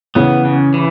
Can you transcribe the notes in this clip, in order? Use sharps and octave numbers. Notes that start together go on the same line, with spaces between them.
C#3 E3 B3
C#3
E3